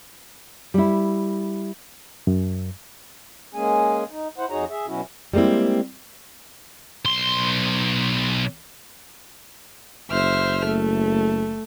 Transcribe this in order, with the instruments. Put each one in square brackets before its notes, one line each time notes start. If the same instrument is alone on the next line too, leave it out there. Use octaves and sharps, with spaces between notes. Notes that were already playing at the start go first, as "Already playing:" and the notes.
[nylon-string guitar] G3 E4
[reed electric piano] F#2
[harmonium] G#3 A#3 C#4 G#4 G#5
D#4
E4 C5 F#5
F2 D#4 F#4 G#4 C#5 A#5
G#4 E5
B2 F#3 C#4 E4 F#4
[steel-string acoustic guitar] G3 G#3 A#3 C4 E4
[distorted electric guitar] B1 C6
[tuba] F#1 [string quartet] C5 E5 F6
[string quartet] A3